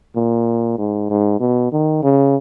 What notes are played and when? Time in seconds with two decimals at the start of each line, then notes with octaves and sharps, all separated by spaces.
0.16 A#2
0.78 G#2
1.10 G#2
1.40 B2
1.72 D#3
2.03 C#3